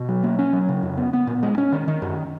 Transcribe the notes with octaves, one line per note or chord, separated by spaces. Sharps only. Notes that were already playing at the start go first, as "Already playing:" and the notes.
Already playing: B2
F#3
A#3
C#4
F#3
C#3
F2
B3
B3
A#2
G#3
C#4
D#3
D#3
F#2